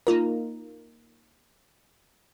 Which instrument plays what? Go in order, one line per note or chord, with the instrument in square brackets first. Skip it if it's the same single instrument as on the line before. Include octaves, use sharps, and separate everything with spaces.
[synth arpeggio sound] A#3 D#4 F4 A#4